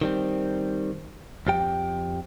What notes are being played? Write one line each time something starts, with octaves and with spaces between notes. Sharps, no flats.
D#3 G3 C4
F2 F3 G4 G5